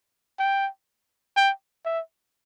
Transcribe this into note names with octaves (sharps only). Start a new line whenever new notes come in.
G5
G5
E5